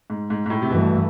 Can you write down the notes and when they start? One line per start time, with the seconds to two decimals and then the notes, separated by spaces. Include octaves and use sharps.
0.10 G#2
0.30 G#2
0.46 G#2
0.50 A2
0.62 C3
0.70 G2 B2 E3 A3